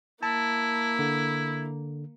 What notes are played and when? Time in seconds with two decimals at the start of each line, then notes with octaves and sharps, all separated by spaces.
0.23 A#3 E4 A5
0.99 D3